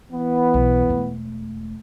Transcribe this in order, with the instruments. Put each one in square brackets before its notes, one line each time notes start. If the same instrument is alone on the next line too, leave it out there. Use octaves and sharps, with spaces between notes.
[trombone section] E3 B3
[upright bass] B1
E1 A3